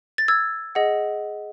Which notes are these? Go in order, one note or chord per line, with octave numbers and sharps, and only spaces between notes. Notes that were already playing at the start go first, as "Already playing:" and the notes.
A6
E6 G#6
G#4 D#5 F#5